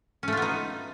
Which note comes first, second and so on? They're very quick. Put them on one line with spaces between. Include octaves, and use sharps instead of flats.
C#4 A3 F4 B3 D#4